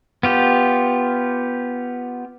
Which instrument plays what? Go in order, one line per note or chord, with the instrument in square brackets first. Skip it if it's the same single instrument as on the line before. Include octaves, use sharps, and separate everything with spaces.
[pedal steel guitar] B3 F4 G4